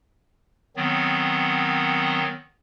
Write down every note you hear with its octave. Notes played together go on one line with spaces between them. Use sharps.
D#3 F#3 B3 C4